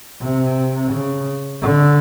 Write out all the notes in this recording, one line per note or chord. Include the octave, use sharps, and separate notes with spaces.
C3
C#3
D3